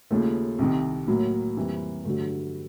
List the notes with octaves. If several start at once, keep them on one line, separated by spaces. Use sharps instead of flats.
D#2 C#3 F3 A3
C2 C3 D#3
A2 F#3 A#3
F2 C3 E3 G3
G2 D3 F#3 A3